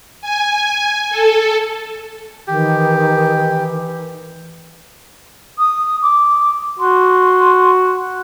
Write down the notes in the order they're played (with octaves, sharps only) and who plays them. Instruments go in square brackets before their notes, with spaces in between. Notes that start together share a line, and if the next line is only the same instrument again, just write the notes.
[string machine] G#5
A4
[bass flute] D#3 [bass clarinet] E3 [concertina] G4
[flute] D#6
D6
[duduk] F#4 [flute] C6